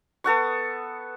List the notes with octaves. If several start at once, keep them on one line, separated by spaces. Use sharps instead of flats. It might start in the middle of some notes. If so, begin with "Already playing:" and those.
B3 A4 F#5 C#6